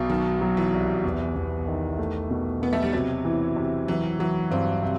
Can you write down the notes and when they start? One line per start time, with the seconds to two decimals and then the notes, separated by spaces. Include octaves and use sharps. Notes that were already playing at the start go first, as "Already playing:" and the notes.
Already playing: B1 B2
0.10 D#3 F#3
0.41 F#3
0.57 E3
0.72 C2
1.04 E2
1.36 E2
1.67 D#3
1.98 A3
2.30 B2
2.62 B2 B3
2.73 A3
2.83 G3
2.93 C3 F#3
3.25 E3
3.56 C3
3.88 E3 F#3
4.19 E3 F#3
4.51 G2 C4
4.82 C3